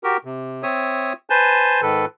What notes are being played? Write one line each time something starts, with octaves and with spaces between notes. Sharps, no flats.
F#4 G4 A#4
C3
C4 C#5 E5 D#6
B4 C5 G#5 A5 G6
G#2 D#3 A4 B4